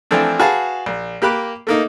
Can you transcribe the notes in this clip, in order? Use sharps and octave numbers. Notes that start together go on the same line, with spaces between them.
E3 F3 A3 C4 D4
F#4 G#4 B4 F5 A5
A#1
A#3 G4 B5 F#6
A3 A#3 D#4